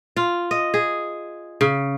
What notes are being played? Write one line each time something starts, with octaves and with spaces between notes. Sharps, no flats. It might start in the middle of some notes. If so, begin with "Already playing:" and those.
F4
D#5
G#4
C#3